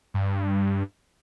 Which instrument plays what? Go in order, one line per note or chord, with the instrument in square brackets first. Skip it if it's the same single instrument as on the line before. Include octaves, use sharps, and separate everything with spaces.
[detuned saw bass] G2